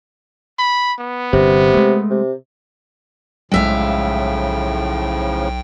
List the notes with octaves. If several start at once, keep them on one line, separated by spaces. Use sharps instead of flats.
B5
B3
G1 C3
G#3 A3
C3
B1 A2 C#3 F3 G#3 E5 F5 G5